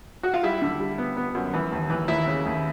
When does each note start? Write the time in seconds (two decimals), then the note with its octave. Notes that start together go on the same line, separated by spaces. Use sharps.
0.23 F#4
0.34 F4
0.43 G3 E4
0.62 D3
0.80 G3
0.98 B3
1.17 B3
1.35 F#2
1.54 E3
1.72 D#2
1.90 E3
2.08 D#2 E4
2.27 C#3
2.45 D#2